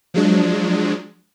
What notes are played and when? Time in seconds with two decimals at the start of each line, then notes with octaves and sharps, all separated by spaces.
0.14 F3 F#3 G#3 D4